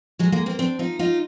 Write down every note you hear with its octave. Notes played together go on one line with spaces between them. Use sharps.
F#3 G#3
G#3 A#3
A#3 C4
C4 D4
D#4 F4
D#4 F4